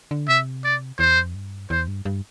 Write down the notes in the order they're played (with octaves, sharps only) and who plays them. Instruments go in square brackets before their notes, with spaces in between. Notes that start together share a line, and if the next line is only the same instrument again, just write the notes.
[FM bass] D3
[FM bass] C3 [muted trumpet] E5
[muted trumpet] D5
[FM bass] E2 [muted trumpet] C5
[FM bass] F2
G2
[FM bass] E2 [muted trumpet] C5
[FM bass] G2
G2